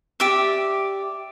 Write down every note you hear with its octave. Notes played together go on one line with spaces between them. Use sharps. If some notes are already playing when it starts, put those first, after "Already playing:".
G4 D5 E5